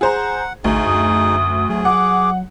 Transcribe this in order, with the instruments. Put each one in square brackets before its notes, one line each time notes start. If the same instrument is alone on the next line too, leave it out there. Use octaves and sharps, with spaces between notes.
[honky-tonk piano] G#4 C5 A#5 [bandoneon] F#5
[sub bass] A1 [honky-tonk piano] D2 [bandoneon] D#4 G#4
[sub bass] F#2 [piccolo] D#6
[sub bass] F#3 [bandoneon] G#4
[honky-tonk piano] F#5 [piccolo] D6